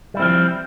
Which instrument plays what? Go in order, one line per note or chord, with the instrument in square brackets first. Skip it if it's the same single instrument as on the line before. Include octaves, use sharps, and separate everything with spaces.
[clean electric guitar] G3
E4
C4
F3